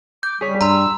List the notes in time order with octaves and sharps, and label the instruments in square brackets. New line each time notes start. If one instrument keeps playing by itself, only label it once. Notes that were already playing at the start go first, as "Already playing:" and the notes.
[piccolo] D6 [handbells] G6
[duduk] G3 [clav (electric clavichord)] G#4 C#5 [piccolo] B6
[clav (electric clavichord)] G2 [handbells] A#5 C6 [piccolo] E6